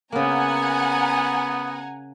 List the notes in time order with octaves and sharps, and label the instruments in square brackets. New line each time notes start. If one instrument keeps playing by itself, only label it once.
[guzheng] C#3 A#3 [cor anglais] B3 [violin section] F#5 G#5 A#5